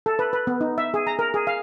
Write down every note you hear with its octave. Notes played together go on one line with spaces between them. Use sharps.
A4
B4
B4
B3
D#4
E5
G#4
A#5
A#4
G#4
F5